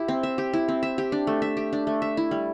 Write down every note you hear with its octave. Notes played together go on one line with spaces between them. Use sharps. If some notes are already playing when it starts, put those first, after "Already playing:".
Already playing: E4 G4
C4
E5
G4
E4
C4
E5
G4
D4
A3
E5
G4
D4
A3
E5
E4
G3